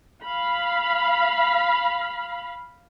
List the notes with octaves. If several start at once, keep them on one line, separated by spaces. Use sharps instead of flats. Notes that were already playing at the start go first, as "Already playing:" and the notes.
F5 B5